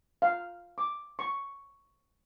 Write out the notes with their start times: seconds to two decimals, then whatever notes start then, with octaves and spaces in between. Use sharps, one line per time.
0.22 F5
0.78 D6
1.19 C#6